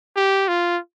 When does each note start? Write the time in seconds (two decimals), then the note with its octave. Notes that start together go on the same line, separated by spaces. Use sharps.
0.16 G4
0.48 F4